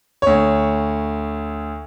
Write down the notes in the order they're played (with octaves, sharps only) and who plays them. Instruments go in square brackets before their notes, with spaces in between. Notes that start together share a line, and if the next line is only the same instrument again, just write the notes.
[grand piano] D2 C#5